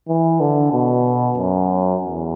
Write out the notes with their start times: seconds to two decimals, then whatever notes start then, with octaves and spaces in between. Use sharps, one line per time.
0.08 E3
0.40 D3
0.73 B2
1.37 F#2
2.03 E2